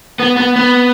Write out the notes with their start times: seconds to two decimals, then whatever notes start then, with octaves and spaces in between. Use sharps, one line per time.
0.20 B3
0.37 B3
0.56 B3